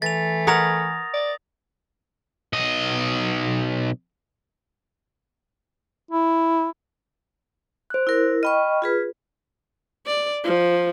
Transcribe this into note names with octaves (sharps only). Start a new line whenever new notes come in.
E3 A3 A6 F7
A#4 C#5 F#5 D#6 A#6 F7
D5
B1 D#5
E4
C5 F#6
E4 A#4
D#5 G5 B5 C#6 F6
F4 G#4 B4
D5
F3